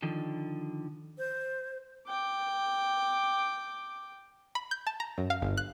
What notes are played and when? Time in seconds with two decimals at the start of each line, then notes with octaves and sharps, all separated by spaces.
0.02 D3 D#3 F3
1.18 C5
2.07 G5 D6
4.55 B5
4.71 G6
4.87 A5
5.00 A#5
5.18 F#2
5.30 F5
5.42 G1
5.57 F#6